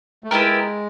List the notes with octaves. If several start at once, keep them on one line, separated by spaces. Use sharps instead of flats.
A3
G#3 B3 E4 G4 A#4